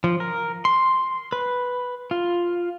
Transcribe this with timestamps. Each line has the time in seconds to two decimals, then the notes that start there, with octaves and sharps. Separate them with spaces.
0.04 F3
0.20 A#4
0.65 C6
1.32 B4
2.11 F4